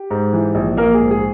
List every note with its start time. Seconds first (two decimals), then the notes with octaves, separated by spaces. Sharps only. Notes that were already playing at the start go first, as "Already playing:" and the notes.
Already playing: G4
0.11 G#2
0.33 E3
0.55 A#1
0.77 A#1 A#3 A#4
0.94 G#4
0.99 G#2
1.11 G#4